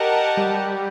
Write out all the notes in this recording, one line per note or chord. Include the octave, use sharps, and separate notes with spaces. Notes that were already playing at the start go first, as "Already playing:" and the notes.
Already playing: G4 A#4 D#5 F#5 A5
G3